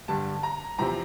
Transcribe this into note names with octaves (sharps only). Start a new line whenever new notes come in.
G2 D3 G3 A5
A#5
E2 C3 F3 C4 A#5